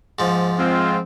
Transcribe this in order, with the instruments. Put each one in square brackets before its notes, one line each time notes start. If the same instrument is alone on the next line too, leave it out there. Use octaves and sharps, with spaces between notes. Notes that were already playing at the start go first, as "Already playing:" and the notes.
[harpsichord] G#2 F3
[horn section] G#3 C4 F4